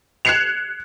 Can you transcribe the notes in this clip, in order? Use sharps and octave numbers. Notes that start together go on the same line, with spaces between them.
F#6 G#6 C7 C#7 E7 F7